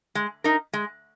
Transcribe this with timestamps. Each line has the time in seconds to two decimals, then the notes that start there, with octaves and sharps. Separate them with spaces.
0.15 G#3
0.44 D#4 A#4
0.73 G#3